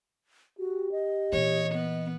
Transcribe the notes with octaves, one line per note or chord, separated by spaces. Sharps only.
F#4 G4
D#5
A#2 E3 C#5
B3